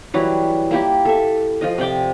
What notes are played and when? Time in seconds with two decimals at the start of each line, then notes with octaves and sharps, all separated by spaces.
0.14 E3 F#3 G3
0.71 A#3 E4 G4
1.05 A4 E5
1.61 F3 F4 D#5
1.78 C3 D5 G5 D6